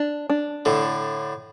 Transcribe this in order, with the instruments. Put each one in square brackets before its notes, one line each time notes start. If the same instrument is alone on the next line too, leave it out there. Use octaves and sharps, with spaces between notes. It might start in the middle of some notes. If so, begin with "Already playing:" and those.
Already playing: [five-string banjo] D4
D4
[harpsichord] A2 D3 [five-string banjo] A4